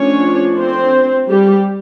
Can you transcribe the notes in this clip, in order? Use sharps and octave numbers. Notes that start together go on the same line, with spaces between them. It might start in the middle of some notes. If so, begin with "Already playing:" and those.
Already playing: F3 A3 C#4 D4 C#5
C4 C5
G3 G4